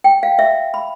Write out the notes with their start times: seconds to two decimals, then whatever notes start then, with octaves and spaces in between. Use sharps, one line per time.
0.04 G5
0.23 F5
0.39 E5
0.74 B5